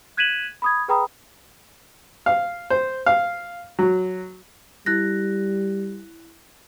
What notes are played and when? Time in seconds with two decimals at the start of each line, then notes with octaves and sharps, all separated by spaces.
0.17 F#6 G#6 B6 D#7 E7 F#7
0.62 B5 D#6 G#6
0.88 G#4 B4 G5 A#5 B5 D#6
2.26 F5
2.70 C5
3.06 F5
3.79 F#3
4.86 G3 E4 F#6 A#6